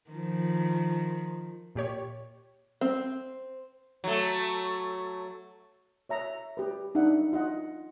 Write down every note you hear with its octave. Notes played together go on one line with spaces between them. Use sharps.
D#3 F3
A#2 G4 C#5
C4
F#3 A3
C#5 E5 A#5
G4 B4
D4 D#4 E5 F#5
F4 D#5 F#5